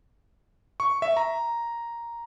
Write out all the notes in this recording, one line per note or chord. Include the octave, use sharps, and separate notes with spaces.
C#6
E5
A#5